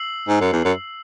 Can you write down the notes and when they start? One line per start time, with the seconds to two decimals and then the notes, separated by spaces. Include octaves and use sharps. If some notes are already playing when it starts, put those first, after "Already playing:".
Already playing: E6 C7 F#7
0.28 G#2
0.41 F#2
0.53 E2
0.64 F#2